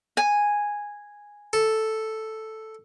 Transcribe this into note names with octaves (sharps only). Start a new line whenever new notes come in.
G#5
A4